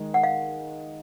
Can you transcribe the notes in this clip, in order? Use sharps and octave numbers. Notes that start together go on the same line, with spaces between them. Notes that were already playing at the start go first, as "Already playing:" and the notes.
Already playing: D#3 G#3 D#4
F#5
F5